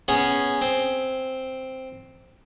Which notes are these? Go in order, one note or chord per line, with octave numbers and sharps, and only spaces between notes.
B3 C#4 G#4
C4